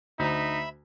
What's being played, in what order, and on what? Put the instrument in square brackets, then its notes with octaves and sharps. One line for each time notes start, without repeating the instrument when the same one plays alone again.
[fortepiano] D2 [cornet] D#4 [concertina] E5 B5